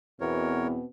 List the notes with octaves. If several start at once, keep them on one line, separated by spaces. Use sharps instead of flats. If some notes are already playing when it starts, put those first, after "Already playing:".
E2 B2 C4 A#4 C#5